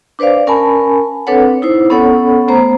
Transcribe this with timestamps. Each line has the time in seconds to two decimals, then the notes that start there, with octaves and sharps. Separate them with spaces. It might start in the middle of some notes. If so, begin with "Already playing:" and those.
0.19 D4 B4 C5 D5 F5
0.47 C#4 A#4 G#5 A5 B5
1.27 C4 D4 A4 B4 C#5 F#5
1.62 D#4 E4 C5
1.90 B3 C#4 A4 C#5 F#5 B5
2.48 A3 B3 C5 A#5